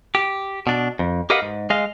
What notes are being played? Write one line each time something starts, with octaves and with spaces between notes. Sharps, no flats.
G4
B2 D4
F2
G4 A#4 B4 D#5 F5 F#5
G#2
G#3 D#5 F5